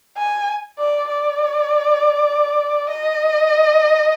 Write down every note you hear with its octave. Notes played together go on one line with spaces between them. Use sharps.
G#5
D5
D5
D#5